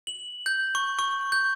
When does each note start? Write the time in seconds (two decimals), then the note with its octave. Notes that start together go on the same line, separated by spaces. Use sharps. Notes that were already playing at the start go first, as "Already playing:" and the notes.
0.07 F#7
0.46 G6
0.75 C#6
0.99 C#6
1.32 G6